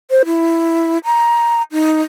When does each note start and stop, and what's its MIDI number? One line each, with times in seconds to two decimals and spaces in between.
0.11 0.23 72
0.26 0.98 64
1.05 1.62 82
1.72 2.02 63